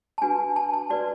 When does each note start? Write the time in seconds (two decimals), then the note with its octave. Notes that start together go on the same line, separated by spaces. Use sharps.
0.18 A5
0.22 D4 F#4 B4 G#5
0.56 A5
0.73 A5
0.90 F#4 B4 D5